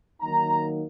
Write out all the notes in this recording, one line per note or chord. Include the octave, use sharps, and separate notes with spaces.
D#3 F#3 A#3 D#4 A#5